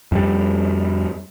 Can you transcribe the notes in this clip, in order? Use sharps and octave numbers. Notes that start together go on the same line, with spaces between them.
F2 G3